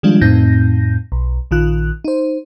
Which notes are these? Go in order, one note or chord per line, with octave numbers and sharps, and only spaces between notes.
D#3 F3 G3 G#3 D4 F4
F2 A2 C4 D#4 G6 A#6
B1
A#1 D#3 F4 F#6
D#4 C5